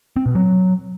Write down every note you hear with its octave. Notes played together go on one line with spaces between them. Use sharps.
C4
B2
F#3